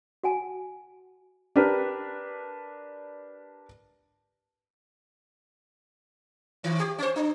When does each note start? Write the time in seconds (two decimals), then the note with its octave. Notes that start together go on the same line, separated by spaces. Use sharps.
0.23 F#4 F#5 G#5 A5
1.56 D4 G4 A#4 B4
6.64 D#3
6.80 G4
6.98 C#4 C5
7.16 D4